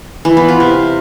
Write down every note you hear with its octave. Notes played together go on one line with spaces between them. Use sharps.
E3
B3
F4
C3